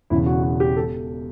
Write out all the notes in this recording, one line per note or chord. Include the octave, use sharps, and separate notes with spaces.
E1 E2 C#3 E4
F#4
F#4
G4
A4